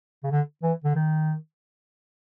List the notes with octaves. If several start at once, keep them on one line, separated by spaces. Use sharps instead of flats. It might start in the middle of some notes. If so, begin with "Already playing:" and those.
C#3
D3
E3
D3
D#3